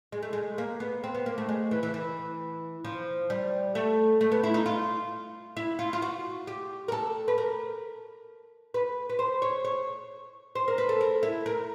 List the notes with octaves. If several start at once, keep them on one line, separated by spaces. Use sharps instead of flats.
G#3
A3
G#3
A#3
B3
C4
B3
A#3
A3
G#3
E3
E3
E3
F3
G3
A3
A3
B3
E4
D#4
F4
E4
F4
F4
F#4
G4
A#4
A4
B4
A#4
B4
B4
C5
C#5
C#5
C5
A#4
B4
A4
A#4
E4
A#4